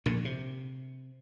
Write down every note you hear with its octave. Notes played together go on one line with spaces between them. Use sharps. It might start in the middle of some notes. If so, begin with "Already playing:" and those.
A#1 A#2 D3
C3